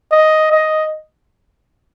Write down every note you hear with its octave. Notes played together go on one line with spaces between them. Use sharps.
D#5
D#5